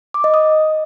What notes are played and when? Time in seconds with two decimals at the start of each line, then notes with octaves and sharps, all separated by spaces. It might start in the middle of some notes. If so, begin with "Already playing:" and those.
0.14 D6
0.24 D#5
0.34 D#6